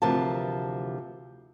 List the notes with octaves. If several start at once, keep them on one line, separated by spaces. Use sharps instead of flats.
D2 C3 E3 F3 A#4 A5